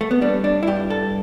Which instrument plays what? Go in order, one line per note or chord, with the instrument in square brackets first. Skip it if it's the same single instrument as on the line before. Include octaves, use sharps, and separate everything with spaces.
[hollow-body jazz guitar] A3
B3
G3 D4
D4
E4
G2 G4
A4